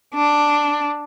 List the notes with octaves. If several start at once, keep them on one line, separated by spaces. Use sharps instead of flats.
D4